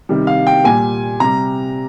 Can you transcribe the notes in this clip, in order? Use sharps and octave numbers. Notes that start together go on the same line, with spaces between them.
C3 D#3 G3
F5
G5
A#2 G3 G#5
C3 G3 A#5